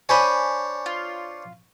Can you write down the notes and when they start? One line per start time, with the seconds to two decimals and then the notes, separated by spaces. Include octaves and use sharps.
0.09 D4 C5 C#5 G#5 B5
0.86 F4